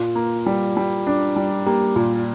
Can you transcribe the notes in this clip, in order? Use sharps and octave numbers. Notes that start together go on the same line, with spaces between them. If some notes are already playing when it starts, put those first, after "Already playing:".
Already playing: A#2 F4
A#3
G3
G3
D4
G3
A#3 G4
A#2 F4